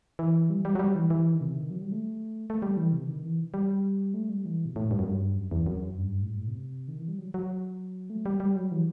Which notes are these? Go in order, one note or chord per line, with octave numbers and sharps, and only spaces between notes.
E3
G3
G3
F#3
G3
E3
E3
D#3
C3
D#3
F#3
G3
A3
A3
G3
E3
C3
D#3
E3
G3
A3
G3
E3
B2
A2
G2
F#2
G2
F#2
E2
F#2
G2
A2
G2
A2
C3
D#3
E3
G3
F#3
F#3
A3
G3
G3
F#3
E3